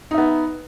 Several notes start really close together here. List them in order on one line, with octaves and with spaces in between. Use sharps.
D#4 E5 B3